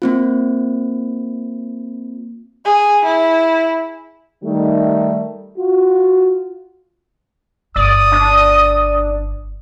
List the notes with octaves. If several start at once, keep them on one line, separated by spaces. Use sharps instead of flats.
A#3 C4 F4
G#4
E4
D#3 G3 A3
F4 F#4
G1 D5 D#6
D4